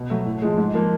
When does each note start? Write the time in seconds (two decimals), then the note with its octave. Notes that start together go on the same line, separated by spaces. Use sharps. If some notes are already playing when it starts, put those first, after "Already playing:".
Already playing: B2
0.10 F#3 A3
0.25 A2
0.42 F3 G#3
0.57 G#2
0.74 F3 A#3